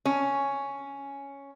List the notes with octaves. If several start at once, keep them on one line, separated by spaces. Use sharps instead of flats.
C#4